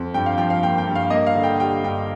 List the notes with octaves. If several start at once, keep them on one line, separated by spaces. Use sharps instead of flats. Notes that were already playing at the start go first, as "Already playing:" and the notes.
Already playing: F2
G2 G5
F5
F3 G5
F5
A#3 G5
G5
G2
F5
A#3 D#5
F5
D3
G5
G3 G5
G2 G5